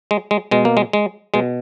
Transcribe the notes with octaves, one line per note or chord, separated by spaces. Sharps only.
G#3
G#3
B2 G#3
A#3
G#3
G#3
B2 G#3